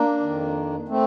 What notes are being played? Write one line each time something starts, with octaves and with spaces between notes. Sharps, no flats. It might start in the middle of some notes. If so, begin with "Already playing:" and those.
Already playing: A#3 D4
F2 D#3
A3 C4